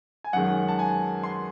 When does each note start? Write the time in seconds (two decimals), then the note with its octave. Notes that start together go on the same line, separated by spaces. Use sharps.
0.24 G#5
0.33 F#2 D#3 G#3 F#5
0.68 A5
0.79 G#5
1.23 C6